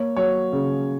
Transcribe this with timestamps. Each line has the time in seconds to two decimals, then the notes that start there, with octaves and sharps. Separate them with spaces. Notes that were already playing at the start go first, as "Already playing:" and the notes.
Already playing: A#3 C#5
0.17 F#3 C#5
0.53 C#3